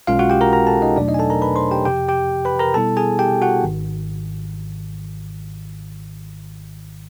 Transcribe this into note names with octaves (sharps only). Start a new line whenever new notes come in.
B1 B2 G#3 C#4 F4 F5
F#4 F#5
G4 G5
A#4 A#5
A#4 A#5
A4 A5
D#4 D#5
E2 B2 F#3 A3 D4 D5
D#4 D#5
G#5
A4 A5
A#4 A#5
B4 B5
C5 C6
G4 G5
F2 C3 F3 G4 G5
G4 G5
B4 B5
A#4 A#5
B2 G3 B3 E4 A4 A5
G#4 G#5
G4 G5
F#4 F#5
G#1 G#2 D#3